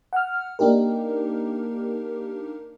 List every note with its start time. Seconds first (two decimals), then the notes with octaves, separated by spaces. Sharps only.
0.13 F#5 F6
0.59 A#3 D4 D#4 G4 A#4